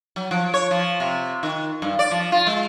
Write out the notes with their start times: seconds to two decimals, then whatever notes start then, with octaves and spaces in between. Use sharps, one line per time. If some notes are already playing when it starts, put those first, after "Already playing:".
0.16 F#3
0.31 F3
0.54 C#5
0.71 F3
1.00 C3
1.43 D#3
1.82 G2
1.99 D5
2.11 F3
2.32 F4
2.47 G#3